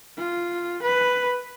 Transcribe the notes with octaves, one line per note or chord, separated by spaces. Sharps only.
F4
B4